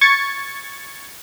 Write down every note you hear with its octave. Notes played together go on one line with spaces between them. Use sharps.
C#6 G#6 A6 C#7